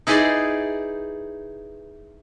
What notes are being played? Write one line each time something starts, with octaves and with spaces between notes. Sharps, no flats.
D#4 E4 G#4 B4 C5 D5